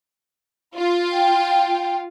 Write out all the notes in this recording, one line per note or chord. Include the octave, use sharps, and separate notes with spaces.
F4
G5